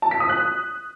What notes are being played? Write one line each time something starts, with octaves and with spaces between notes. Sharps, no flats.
A5
B6
D#6
F#6